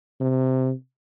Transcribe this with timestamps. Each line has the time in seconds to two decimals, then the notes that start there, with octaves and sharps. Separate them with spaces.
0.21 C3